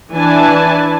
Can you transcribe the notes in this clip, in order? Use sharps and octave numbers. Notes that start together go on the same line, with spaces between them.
E3 D4 B4 G#5 A5